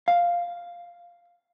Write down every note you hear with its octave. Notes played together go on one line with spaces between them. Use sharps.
F5